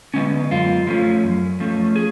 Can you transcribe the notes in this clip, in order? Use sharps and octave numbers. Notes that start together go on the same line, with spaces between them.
D3 G#3 B3 C#4
F#2 F4
F3 A3 C#4
F#2
F3 A3 C#4
G#4